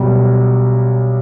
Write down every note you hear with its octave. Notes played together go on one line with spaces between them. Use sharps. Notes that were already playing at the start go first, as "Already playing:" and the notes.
Already playing: B1 B2 G3